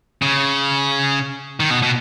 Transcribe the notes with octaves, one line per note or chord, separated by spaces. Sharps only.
C#3
D#3
B2
B2